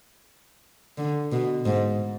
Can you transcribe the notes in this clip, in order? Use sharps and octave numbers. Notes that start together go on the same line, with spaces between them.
D3
B2
G#2